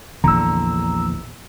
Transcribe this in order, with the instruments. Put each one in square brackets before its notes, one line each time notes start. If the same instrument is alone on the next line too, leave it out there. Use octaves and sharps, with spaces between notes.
[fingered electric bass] A#1 E2 [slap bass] D3 [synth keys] A#5 E6